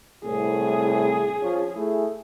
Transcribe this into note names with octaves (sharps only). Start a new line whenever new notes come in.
C2 A2 G#4
F3 C#4
A3 E4 G#4